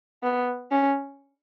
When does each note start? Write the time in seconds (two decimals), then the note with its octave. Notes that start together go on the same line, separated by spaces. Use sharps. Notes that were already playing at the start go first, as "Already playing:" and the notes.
0.23 B3
0.72 C#4